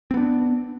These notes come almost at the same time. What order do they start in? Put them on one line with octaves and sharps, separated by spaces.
C4 B3 D4